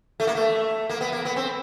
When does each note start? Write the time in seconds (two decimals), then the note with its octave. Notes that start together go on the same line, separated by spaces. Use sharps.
0.20 A3
0.27 A#3
0.35 A3
0.89 A#3
1.01 B3
1.12 A#3
1.25 B3
1.36 C4